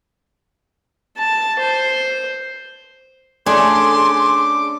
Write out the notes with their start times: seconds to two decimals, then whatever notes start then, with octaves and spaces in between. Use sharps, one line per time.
1.17 A5
1.59 C5
3.46 A3 C#4 D4 G#4 C6 D6